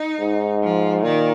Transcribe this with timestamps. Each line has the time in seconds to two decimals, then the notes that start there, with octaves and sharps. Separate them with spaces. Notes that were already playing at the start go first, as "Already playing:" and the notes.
Already playing: D#4
0.20 G#2
0.62 F3
1.03 A#2 D#3